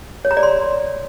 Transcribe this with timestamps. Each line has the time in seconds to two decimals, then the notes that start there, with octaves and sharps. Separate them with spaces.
0.25 C#5
0.31 A#5
0.37 D5
0.43 C6